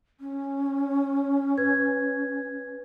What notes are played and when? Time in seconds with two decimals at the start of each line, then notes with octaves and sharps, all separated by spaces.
0.20 C#4
1.58 B4 G#6